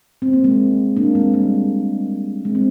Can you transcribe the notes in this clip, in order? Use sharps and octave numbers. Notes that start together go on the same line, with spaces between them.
C4
A#3
G#3 C4
A#3 D4
G#3 C4
G3 A#3
G#3 C4
C4